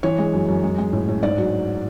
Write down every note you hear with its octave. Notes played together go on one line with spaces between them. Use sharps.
E3 C#5
G#3
F#2
F#2
G#3
G#3
A2
A2
G#2 D5
F#3